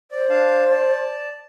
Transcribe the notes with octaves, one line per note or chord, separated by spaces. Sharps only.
C5 D5
D4 F5 A5
D5 A5